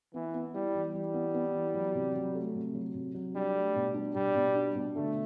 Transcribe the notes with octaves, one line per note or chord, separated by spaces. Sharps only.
E3 B3
B3
G3 E4
E3
E3 G3
B3
B3
E3
F#3
C3
F#3
A3
C3
F#3
C3
F#3
G3 D4
A3
B2
D4
B2 G3
B2
D4
B2
D3 A3